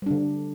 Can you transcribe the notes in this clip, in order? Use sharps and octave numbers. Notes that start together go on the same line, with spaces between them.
D3 G3 D4